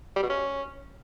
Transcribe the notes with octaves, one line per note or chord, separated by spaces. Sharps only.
G3
B2
C#4